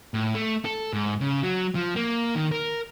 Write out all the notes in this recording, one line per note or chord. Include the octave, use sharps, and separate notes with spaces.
A2
A3
A4
G#2
C#3
F#3
F3
A#3
D#3
A#4